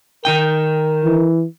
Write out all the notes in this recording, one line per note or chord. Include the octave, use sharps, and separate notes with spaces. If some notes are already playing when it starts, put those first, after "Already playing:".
D#3 D#4 A#4 G5
E3